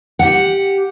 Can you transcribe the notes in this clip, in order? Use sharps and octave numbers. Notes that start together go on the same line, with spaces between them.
G4 F#5